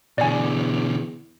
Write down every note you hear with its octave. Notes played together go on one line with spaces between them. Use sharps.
E2 B2 D3 D5 G#5